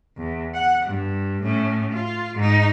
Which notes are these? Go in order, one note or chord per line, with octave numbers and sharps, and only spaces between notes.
E2
F#5
G2
A2 C#4
F4
G#2 D#4